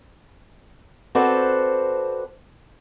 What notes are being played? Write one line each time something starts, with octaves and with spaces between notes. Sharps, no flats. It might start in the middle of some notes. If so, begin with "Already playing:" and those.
C4 F#4 A4 B4 C5 D5